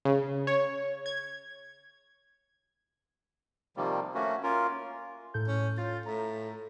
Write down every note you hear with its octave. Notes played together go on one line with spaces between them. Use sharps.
C#3
C#5
G#6
C3 D#3 F3 G3 A#3
A3 A#3 C#4 F#4
A#3 C#4 F4 A#4
A2 A4 G6
C#4
F4 A6
A2 A#5